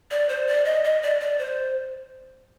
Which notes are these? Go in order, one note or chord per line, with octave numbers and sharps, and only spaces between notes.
D5
C5
D5
D#5
D#5
D5
D5
C5